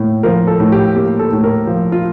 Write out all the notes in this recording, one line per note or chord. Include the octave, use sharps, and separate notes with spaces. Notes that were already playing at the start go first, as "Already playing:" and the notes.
Already playing: A2 A#3
F3 A#4
A4
A2
G4
A#3 G4
A4
A2
A#4
F3
F4